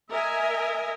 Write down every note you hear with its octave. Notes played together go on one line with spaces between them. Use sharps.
A#4 D#5 E5 G#5